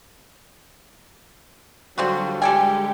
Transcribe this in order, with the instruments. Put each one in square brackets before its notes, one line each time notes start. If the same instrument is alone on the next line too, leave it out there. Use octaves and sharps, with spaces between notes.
[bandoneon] D3 G3 [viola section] F#3 [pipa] C4 F4 F#4
[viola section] G#3 G4 [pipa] A4 D5 G#5 [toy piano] G5